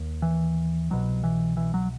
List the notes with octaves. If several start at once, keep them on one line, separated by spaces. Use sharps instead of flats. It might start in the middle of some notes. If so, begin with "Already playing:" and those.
Already playing: D#2
E3
C2 B2 F#3
E3
E3
F#3